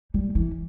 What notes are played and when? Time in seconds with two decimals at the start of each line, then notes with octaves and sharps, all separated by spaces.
0.14 G3
0.35 E3